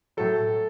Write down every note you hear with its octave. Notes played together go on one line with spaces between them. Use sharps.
A2 F#3 A4